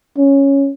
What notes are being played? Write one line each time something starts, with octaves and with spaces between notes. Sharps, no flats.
C#4